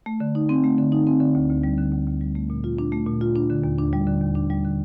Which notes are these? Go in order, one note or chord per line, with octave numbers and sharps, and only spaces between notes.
A3
D3
D#4
C4
A3
D3
D#4
C4
D3
D2
D2
G3
D3
D2
D2
G3
A3
A#2
F4
D4
A3
A#2
F4
D4
D3
D#2
D4
G3
D3
D#2
D4
G3
D3